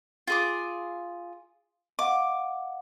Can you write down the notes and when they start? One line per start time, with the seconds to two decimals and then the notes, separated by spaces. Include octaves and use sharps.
0.27 F4 G#4 D6
1.99 D#5 F5 F#5 D6